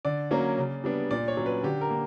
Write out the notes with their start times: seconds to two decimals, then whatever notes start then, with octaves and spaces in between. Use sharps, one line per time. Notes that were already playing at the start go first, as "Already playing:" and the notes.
0.05 D3 D5
0.31 F#3 A#3 C#4
0.58 C#3
0.84 G3 B3 D4
1.11 A#2 D5
1.28 C#5
1.37 F#3 C#4
1.46 B4
1.63 D3 G4
1.81 A#4
1.90 A#3